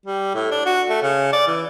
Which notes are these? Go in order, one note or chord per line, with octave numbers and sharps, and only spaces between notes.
G3
A2
D4
F#4
A3
C#3
D5
E3